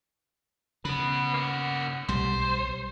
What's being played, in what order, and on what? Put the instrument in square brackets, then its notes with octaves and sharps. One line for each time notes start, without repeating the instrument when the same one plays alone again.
[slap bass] C#3 [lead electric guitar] F#4 B4
[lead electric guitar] A#3 F#4
[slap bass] B1 G3 [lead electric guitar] C5